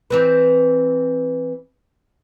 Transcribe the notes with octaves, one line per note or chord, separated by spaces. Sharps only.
E3 C4 B4